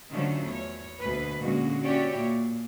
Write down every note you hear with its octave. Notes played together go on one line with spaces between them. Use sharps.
D3 D#3 F3 F#3 A3 C#4
E2 C#5
D2 B2 B4
A#2 D3 G#3 C#4 F#4
C#4 E4 F#4 G4 C#5 D5
A#2